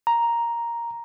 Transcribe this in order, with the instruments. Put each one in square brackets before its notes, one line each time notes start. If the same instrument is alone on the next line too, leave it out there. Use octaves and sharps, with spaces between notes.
[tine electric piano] A#5